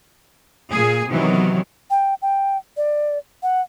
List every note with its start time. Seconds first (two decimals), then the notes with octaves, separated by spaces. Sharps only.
0.70 A#2 G#4
1.09 C3 D#3 E3 F#3 B3
1.90 G5
2.22 G5
2.77 D5
3.43 F#5